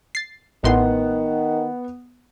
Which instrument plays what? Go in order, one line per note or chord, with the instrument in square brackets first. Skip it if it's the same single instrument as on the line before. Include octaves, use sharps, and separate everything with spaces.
[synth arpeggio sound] A6 C7
[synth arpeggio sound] A1 A2 C6 [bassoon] D#3 [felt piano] B3 F#5